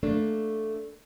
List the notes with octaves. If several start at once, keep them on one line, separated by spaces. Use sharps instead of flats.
A3 A#3 D4